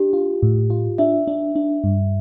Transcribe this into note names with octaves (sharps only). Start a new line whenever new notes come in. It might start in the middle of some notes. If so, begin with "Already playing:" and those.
Already playing: D4 G4
F4
A2
F4
D4 E5
D4
D4
G2